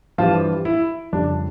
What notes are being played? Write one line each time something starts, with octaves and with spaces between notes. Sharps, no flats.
G2 E3 F3 G3 F4
E4
F2 C#3 G3 D4